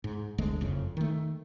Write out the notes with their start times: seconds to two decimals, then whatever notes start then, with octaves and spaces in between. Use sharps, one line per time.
0.04 G#2
0.38 G1 D2 D3 G#3
0.61 F#1 F2 C#3
0.97 D#3 A3